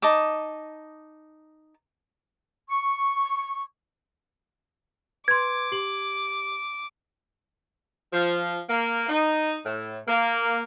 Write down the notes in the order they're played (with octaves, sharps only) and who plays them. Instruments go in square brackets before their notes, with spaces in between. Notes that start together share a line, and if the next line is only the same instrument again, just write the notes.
[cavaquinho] D#4 A5 D6 D#6
[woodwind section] C#6
[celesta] B4 C6 [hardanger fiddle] D6 [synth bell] G#6
[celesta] G4 F#7
[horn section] F3
A#3
D#4
A2
A#3